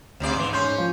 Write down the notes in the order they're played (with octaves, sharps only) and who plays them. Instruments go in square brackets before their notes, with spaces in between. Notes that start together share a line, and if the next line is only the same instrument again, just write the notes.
[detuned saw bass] D2 [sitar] G#2 C3 D5
[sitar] E2 E3 [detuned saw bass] G#2
[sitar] C#4 [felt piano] C6 G6
[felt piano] F3